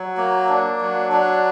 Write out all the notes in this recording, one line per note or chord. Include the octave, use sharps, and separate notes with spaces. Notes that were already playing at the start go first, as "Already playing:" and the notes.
Already playing: F#3
A#3
D4
F#3
D4